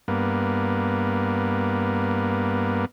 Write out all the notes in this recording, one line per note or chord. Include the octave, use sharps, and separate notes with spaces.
G2 A#3 B3